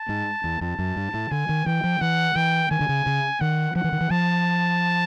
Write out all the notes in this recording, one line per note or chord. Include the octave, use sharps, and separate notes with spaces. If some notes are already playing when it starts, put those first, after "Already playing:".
Already playing: A5
G#2
E2
F2 A5
F#2
G2
A2
D3 G#5
D#3
E3 G5
F3
E3 F#5
E3 G5
D#3 G#5
D3
C#3
C#3
D#3 F#5
F3 F#5
E3
D#3
E3
F3 A5